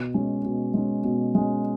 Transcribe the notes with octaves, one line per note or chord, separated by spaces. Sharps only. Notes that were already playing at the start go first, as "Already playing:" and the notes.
Already playing: B2
G#3 C#4
B2
G#3 C#4
B2
G#3 C#4